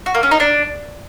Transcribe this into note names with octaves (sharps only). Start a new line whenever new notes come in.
F#4
A#3
C#4
D#4
D4